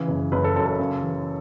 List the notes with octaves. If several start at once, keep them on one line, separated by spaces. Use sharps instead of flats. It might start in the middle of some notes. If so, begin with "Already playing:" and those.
Already playing: C#3 E3
F#1
F#1 B4
A4
F#2 A4
A4
C#3
E3